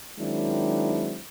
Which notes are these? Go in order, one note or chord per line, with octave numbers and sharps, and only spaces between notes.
D#3 F#3 G#3 C4 D4 E4